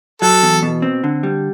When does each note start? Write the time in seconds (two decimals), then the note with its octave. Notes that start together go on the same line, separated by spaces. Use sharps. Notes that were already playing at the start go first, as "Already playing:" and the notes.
0.22 F#3 A4
0.43 E2
0.63 B2
0.82 C4
1.04 D3
1.23 G3